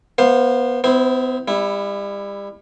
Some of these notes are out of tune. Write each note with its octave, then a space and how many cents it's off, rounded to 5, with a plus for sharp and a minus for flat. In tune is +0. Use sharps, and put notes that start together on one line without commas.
B3 -20 C5 +0 F5 +0
B3 +40 E4 +0 C5 +0
G3 +35 E4 +0